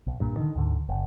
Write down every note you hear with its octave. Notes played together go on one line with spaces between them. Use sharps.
B1
G2 A#2
D3 D#3
D2 G#2 D3
F#1